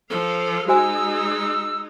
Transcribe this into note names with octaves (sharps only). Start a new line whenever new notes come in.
F3 A4 F5
G#3 D#4 F#4 C5 G#5 E6